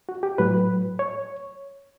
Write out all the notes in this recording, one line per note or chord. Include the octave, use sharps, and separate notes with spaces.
F#4
G4
A2 F#3 B4
C#5